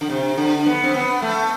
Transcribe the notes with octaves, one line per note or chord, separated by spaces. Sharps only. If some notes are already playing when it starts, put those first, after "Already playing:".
D3
C3
D3
B3
C4
B3
A3